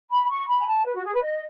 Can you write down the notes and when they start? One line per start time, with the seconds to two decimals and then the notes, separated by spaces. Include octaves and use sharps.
0.10 B5
0.29 C#6
0.47 B5
0.59 G#5
0.66 A5
0.85 B4
0.95 F#4
1.04 G#4
1.13 B4
1.22 D#5